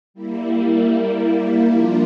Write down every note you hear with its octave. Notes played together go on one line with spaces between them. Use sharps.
G3 A#3 E4
F3 A#3 D4 F4